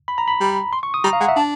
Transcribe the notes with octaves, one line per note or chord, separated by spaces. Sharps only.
B5
A#5
B5
G3
C6
C#6
D#6
G3 A#5
F5
G#3 F#5
E5
D4 A5